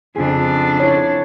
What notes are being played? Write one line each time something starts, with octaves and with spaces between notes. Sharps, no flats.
F2 C#3 D4 G#4
E4 C#5